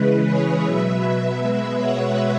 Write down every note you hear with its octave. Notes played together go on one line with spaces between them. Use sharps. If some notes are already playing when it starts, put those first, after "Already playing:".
Already playing: C#3 E3 G#3 B4
G#4 C#5
B2 F#3 B4 E5
B2 G#3 B4 E5
C#5 F#5